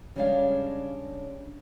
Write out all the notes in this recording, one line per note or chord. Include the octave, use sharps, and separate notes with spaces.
C#3 G3 G#3 D4 C#5 F5